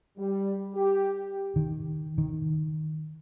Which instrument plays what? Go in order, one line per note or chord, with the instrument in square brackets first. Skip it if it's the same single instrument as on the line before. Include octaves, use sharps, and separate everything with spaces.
[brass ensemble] G3
G4
[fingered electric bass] D#3
D#3